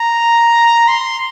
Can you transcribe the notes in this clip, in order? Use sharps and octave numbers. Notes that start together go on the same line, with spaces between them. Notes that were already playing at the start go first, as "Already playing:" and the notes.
Already playing: A#5
C6